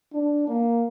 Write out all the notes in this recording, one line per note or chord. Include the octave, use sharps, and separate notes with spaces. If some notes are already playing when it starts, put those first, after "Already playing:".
D4
A#3